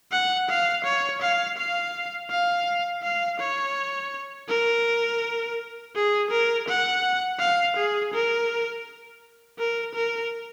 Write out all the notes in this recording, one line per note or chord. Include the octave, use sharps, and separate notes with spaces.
F#5
F5
C#5
F5
F5
F5
F5
C#5
A#4
G#4
A#4
F#5
F5
G#4
A#4
A#4
A#4